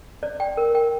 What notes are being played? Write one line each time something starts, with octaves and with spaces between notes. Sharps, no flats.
D5
G5
A#4
G5